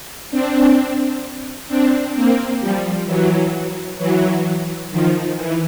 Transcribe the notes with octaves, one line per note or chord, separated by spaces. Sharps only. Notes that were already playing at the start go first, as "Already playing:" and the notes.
C4 D4
C4 D4
A#3 C4
F3 G3
E3 F#3
E3 F#3
D#3 F3
E3